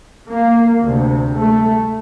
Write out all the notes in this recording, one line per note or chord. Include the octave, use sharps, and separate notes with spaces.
A#3
D2 C3
A3